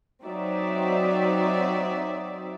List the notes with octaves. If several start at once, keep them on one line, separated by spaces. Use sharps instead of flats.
F#3 C4 D#4 D5 E5